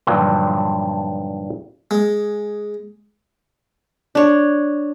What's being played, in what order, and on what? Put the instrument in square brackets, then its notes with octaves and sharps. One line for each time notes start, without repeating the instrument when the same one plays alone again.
[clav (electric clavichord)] G2 A#2 D3 D#3 F3 F#3
[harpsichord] G#3
[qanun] D4 C#5